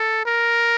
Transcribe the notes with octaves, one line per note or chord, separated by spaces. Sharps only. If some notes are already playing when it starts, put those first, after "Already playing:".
Already playing: A4
A#4